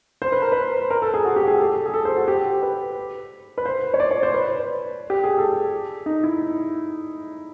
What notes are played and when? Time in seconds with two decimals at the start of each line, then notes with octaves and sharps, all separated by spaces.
0.22 C5
0.32 B4
0.42 A#4
0.52 B4
0.90 A#4
1.02 A4
1.14 G#4
1.25 F#4
1.36 G4
1.48 G#4
1.60 A4
1.86 G#4
1.94 A4
2.05 C5
2.17 F#4
2.28 G4
2.62 B4
3.58 B4
3.65 C5
3.94 C#5
4.00 D5
4.11 C#5
4.23 C5
4.34 B4
5.10 G4
5.24 G#4
5.38 A4
6.06 D#4
6.23 E4